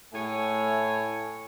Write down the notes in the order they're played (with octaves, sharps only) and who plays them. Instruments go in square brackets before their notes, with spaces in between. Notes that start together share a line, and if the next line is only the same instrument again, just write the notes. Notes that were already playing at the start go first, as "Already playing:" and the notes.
[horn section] A2 A3 C#5 G#5